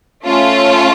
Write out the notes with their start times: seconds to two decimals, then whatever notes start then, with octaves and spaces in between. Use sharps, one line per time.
0.25 A3 C#4 F4